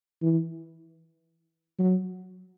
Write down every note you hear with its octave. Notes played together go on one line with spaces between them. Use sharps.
E3
F#3